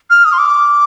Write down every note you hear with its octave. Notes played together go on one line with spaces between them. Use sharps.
F6
D#6
C6
D6